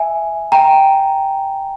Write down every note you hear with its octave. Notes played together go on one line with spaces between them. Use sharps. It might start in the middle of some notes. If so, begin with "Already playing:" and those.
Already playing: E5 G#5
G5 A#5